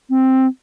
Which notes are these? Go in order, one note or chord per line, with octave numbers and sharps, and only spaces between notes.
C4